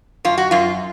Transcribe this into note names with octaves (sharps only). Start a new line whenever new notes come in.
F#2 F4
F#4
F#2 F4